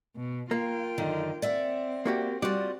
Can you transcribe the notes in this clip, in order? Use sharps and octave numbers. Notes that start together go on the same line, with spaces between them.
B2
A#3 F4 G5
F#2 D3 D#3
C4 D5 E5 F#5
A#3 F#4 G4
G3 F4 F#4 D5